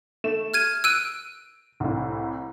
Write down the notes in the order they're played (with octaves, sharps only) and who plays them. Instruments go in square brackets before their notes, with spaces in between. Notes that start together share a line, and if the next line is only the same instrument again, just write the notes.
[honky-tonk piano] A3 E7
[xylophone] F6 G#6 D#7
[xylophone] E6 F#6 D#7 [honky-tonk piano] D7
[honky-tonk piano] C2 A2